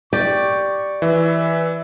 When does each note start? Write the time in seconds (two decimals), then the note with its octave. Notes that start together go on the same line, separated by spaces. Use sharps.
0.13 G4 D5 C#6
1.02 E3 E5